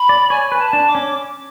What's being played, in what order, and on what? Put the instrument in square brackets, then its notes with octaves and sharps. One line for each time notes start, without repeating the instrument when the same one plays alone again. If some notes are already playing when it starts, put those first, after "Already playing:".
Already playing: [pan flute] B5
[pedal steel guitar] D5
[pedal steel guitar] C#5 [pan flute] G#5
[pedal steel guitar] B4
[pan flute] A5
[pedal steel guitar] D4
[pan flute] D6
[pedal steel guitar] C#4